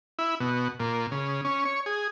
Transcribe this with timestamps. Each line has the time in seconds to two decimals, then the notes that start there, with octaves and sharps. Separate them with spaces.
0.19 E4
0.40 B2
0.80 A#2
1.11 C#3
1.45 C#4
1.65 C#5
1.86 G#4